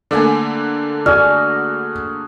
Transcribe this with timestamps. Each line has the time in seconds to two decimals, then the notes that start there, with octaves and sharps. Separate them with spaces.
0.11 D3 A3 A#3 D5 F#5 G#5
1.06 F#4 G#4 D5 F6